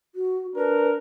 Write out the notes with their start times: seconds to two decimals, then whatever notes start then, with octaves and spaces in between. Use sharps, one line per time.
0.15 F#4
0.55 D4 A#4 B4